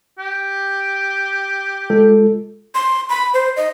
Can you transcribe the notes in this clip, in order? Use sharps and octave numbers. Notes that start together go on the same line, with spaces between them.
G4
G#3 F4 A4
C6
B5
C5
D#5